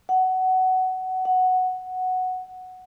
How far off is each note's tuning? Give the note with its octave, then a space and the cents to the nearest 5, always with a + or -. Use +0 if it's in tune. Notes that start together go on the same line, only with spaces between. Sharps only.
F#5 +15
F#5 +0